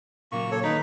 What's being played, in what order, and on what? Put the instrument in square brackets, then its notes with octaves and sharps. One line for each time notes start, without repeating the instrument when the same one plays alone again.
[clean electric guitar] A#2 C#3 F#3 [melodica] A#3 C#6
[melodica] A4 C#5
[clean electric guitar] D#3 B4 [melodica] D#4